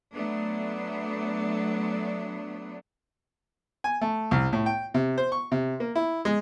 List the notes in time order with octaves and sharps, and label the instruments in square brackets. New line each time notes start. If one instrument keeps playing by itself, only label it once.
[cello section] F#3 A3 B3 D4
[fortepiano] G#5
A3
C2
A2
G5
C3
C5
C#6
C3
A#3
E4
G#3